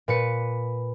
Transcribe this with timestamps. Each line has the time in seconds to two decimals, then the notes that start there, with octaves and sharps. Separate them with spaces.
0.08 A#2 B4 C#7